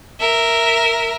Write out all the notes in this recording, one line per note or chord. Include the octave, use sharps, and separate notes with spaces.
A#4 E5